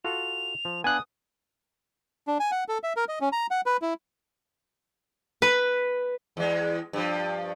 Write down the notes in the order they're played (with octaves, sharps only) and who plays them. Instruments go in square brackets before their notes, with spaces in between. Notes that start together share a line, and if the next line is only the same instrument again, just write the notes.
[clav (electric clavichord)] F4 F#4 A4 [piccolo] F7
[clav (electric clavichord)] F3
[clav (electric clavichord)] B3 D4 F5 [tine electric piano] G#5 F#6 [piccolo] D#6
[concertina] D4
G#5
F#5
A4
E5
A#4
D#5
C#4
A#5
F#5
B4
E4
[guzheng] B4
[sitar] E2 G#3
G2 F3